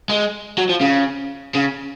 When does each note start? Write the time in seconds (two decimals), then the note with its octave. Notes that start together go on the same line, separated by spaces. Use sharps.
0.10 G#3
0.58 F#3
0.69 F3
0.80 C#3
1.55 C#3